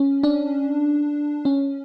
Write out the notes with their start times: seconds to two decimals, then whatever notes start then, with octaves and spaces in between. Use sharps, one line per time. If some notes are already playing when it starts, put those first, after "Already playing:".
Already playing: C#4
0.23 D4
1.45 C#4